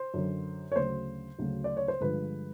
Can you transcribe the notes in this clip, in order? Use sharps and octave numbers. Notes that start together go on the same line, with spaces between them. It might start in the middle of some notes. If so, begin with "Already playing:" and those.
Already playing: C5
F#2 D3 F#3
C#5
D2 C#3 F#3 C5
D2 C#3 F#3
D5
C#5
C5
G2 D3 F3 G#3 B4